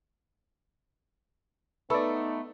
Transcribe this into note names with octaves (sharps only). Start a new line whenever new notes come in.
A3 B3 D#4 A4 B4 D5 B5 E6